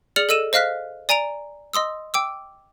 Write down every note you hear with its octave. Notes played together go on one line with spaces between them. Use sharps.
G#4 D5 F6 C#7 F7 F#7
A4 D#5 E6 D#7 E7
C5 D#5 F5 F6 F#6 B6
D5 G#5 A#5 D7 F7
D#5 C6 D#6 E6
G5 D6 E6